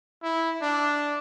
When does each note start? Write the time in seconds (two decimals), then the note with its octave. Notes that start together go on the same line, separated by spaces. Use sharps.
0.23 E4
0.62 D4